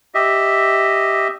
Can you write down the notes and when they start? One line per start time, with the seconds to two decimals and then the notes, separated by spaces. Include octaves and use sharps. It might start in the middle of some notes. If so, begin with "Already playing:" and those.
0.15 G4 D#5 E5